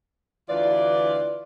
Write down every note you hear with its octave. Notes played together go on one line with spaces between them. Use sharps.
D2 E3 F4 D5